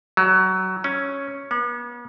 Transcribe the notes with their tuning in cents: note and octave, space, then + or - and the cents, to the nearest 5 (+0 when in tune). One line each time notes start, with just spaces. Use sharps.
F#3 +20
C#4 +0
B3 -40